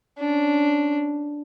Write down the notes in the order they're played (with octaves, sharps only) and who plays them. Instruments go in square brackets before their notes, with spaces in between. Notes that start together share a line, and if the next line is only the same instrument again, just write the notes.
[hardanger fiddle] C#4 D4